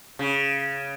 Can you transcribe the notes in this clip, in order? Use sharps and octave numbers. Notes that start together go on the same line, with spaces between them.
C#3